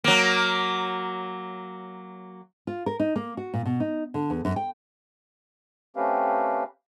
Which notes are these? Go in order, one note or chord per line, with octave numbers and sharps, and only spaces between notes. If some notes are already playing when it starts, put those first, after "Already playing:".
F#3 A#3
F4
A#4
D#4
A#3
F#4
A#2
B2
D#4
D3
E2
F#2
G5
A3 C4 C#4 G4 B4 F5